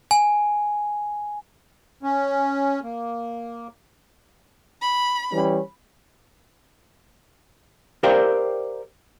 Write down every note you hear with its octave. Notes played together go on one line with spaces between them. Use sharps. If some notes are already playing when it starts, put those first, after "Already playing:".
G#5
C#4
A#3
B5
E3 G3 C#4
G4 A#4 C5 D5 F5 G5